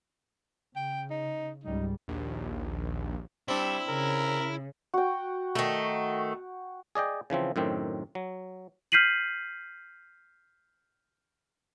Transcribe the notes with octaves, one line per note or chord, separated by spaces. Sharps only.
C#3 G5
D#4
C#2 G#2 G3 D#4
A#1 D#2
G3 C4 D4 E4
C#3 A#4
F#4 G5
D#3 A3
G#4 D5 D#5 G5
C#3 E3 F3 C4
F#2 A2 D#3 C4
F#3
F6 G6 B6 C7 D#7 F#7